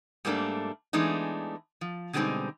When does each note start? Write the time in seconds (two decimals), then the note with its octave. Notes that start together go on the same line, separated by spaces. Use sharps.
0.25 G#2 G3 A3 A#3 D4
0.93 E3 G#3 A3 B3 D4 D#4
1.81 F3
2.13 B2 D3 G3 G#3 C4 D#4